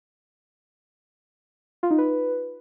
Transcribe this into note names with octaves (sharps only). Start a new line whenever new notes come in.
F4
D#4
B4